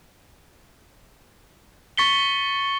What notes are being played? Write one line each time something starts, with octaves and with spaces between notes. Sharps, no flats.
C#6 A6 B6 C#7 G7